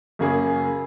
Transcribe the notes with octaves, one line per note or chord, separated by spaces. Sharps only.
F#2 C#3 A#3 C#4 G#4